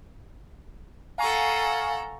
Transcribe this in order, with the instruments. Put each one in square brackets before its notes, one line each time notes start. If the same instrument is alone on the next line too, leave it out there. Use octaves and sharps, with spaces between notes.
[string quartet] A4 F#5 A#5 [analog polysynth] F5 G#5 C#6